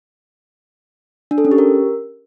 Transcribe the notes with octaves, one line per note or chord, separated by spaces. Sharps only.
D4
A4
C#4
G4
A#4